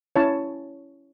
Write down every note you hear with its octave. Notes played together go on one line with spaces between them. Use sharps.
C#4 E4 C#5 A5